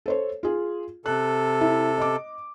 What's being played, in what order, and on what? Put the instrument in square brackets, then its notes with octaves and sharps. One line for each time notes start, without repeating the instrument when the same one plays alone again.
[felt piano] A4 C5 C#5
F4 G#4
[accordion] C3 A4 [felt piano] F#6
[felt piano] E4
D#5 D6